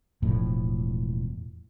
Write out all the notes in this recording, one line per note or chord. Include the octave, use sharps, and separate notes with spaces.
E1 A2 F3